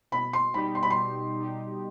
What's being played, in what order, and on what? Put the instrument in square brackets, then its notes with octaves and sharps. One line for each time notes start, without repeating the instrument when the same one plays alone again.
[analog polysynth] B2 [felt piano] B5
[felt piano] C6
[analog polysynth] G3 D#4 G4 [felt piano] B5
[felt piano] C6
B5
C6
[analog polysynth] B2
G3 D#4 G4